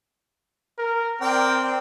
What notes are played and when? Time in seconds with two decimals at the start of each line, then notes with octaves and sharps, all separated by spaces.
0.79 A#4
1.21 C4 A#4 D5 G5